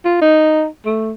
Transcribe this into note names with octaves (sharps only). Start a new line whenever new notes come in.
F4
D#4
A3